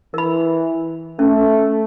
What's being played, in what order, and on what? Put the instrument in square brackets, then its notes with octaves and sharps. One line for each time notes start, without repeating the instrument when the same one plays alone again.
[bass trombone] E3 [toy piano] A#4 B5
[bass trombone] A3 [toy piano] C#4